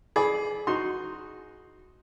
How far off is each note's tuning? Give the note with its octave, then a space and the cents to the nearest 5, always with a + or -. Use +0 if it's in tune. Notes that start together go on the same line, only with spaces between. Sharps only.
G#4 +20 D5 -5 B5 +0
D#4 +0 F#4 +0 C6 +5